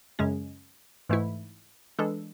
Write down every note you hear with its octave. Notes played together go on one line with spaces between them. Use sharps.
F#2 C#3 G#3 C#4
G#2 E3 A3 E4
E3 G#3 D4 A4